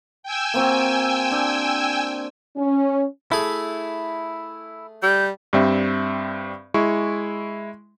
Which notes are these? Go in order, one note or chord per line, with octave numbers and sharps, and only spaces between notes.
G5 G#5 E6
A#3 C4 F#4
D4
C#4
A3 E4 G#4
G3 G6
G2 G3 C4 E5
G#3 E4 C#6